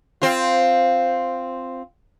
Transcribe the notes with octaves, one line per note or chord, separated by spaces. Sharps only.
C4 F4